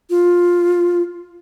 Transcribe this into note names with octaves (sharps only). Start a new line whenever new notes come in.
F4